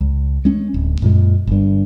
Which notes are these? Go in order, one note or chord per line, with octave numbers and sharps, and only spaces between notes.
C#2
G#3 C#4
D1
F#2 A#2 G#3
G1 G2